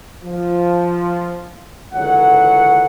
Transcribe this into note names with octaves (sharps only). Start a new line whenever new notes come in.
F3
C#2 D3 E3 F#3 C#5 F#5